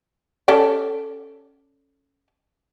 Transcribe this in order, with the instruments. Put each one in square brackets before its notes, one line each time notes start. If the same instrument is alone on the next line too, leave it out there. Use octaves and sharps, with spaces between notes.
[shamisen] C#4 A4 D5